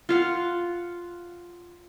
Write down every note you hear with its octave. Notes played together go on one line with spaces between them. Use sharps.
F4 F5 F#5